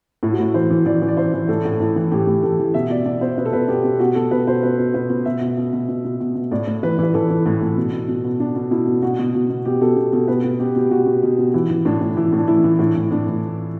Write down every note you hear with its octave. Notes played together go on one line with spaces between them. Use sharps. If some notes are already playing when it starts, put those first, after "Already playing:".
A2 E4
F#4
A2 E4
E3 C5
E3
E3 D5
E3
D5
E3 C5
E3
A2 A4
A2
A2 E4
E3
A2 G4
A2
E3 A4
E3
B2 E5
B2 D5
B2 D5
B2 C5
B2 B4
A4
B2 B4
B2 G4
B2
B2 F#4
B2 A4
B2 B4
B2 C5
B2 B4
B2
B2 B4
B2
B2 E5
B2
B2
B2
B2
B2
B2
B2
A2 D5
A2
E3 B4
E3 B4
E3 A4
E3
A2
A2
B2
B2
B2
B2
B2 D4
B2
B2 E4
B2
B2 F#4
B2
B2
B2
B2 G4
B2 A4
B2
B2 A4
B2 B4
B2
B2 G4
B2 G4
B2 F#4
B2
B2
B2
E3 E4
E3
A2 D4
A2
E3 E4
A2
D4
E3 E4
E3
A2 E4
E3
A2 D4
E3